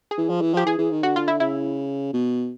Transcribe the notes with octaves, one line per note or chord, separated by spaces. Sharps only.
G#4
E3
F3
E3
F3 G4
E3 G#4
E3
D#3
D3 F#4
F4
E4
C#3 E4
B2